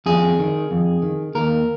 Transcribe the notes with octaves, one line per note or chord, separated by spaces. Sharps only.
F2 G#4
D#3
F2
D#3
D#2 A#4